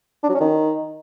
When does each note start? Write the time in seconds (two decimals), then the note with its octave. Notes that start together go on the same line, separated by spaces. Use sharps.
0.23 D4
0.29 F#3
0.35 C#4
0.40 D#3